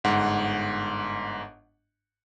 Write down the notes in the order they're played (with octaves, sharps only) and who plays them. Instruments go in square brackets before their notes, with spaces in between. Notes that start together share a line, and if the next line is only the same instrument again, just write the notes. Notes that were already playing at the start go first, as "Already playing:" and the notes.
[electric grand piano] G1 G#2 F#5